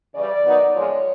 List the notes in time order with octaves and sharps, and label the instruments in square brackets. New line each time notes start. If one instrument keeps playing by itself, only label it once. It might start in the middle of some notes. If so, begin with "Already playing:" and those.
[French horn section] C#3 E3 G3 D5
D#3 F#3 B3 D#4
A#2 F3 G#3 C#5